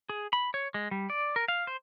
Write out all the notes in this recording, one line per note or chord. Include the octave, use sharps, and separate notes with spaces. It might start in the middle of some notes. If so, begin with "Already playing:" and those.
G#4
B5
C#5
G#3
G3
D5
A#4
F5
C5